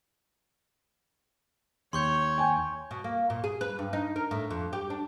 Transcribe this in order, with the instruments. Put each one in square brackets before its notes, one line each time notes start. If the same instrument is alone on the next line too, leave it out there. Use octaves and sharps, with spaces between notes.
[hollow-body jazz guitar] D#2 [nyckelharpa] C#5 [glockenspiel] C6 C#6 G6
[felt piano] G5 G#5
[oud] B2
A#3
A#2
G#4
B4
G2
D#4
A#4
A2
F2
G4
D4